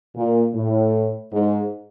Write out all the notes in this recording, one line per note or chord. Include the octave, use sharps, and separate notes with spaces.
A#2
A2
G#2